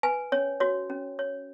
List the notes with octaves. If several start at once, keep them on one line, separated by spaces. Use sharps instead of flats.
B4 G#5
C#4 C#5
F#4 C#5
C#4
C#5